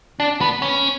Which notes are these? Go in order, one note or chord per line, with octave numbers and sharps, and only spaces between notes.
D4
B3
C#4